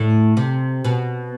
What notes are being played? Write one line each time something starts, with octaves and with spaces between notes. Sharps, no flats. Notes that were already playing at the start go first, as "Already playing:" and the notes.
Already playing: A2
C3
B2